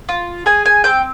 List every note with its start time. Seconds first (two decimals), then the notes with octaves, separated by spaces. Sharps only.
0.09 F4
0.46 G#4 G#5
0.66 G#5
0.84 C4 G5